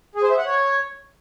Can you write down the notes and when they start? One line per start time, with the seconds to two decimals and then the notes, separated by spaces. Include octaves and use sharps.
0.15 G#4
0.23 C5
0.31 E5
0.38 F#5
0.46 C#5